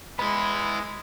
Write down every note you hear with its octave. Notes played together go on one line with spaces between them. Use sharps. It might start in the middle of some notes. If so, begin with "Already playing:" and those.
G#3 B3 E4 B5